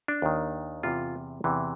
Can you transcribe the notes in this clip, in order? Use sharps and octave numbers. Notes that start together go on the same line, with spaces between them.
D4
D#2 D#3
E2 C3 E3 F4
E2 C3 E3